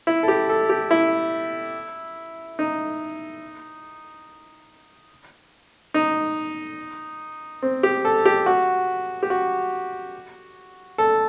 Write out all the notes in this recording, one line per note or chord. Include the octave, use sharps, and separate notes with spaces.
E4
A4
G4
A4
G4
E4
D#4
D#4
C4
G4
A4
G4
F#4
G4
F#4
A4